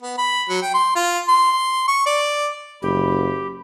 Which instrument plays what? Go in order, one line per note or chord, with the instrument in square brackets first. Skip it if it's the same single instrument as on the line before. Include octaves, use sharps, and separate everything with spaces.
[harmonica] B3
B5
F#3
G5
C6
F4
C6
C#6
D5
[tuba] F#1 [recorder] G4 [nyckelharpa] B5